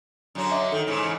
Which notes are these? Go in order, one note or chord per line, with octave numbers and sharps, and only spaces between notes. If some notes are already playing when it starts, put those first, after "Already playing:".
F#2 D3 F#3
D#5 E5 D6
D#3 A4
G#2 C#3 E3